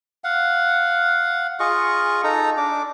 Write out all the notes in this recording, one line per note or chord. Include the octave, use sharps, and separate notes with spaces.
F5 F#5
F4 G#4 D#5 C#6
D#4 A4 A#5
D4 D6